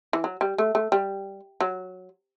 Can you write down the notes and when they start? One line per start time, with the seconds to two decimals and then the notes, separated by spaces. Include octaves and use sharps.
0.13 E3
0.24 F#3
0.41 G3
0.58 A3
0.75 A3
0.92 G3
1.61 F#3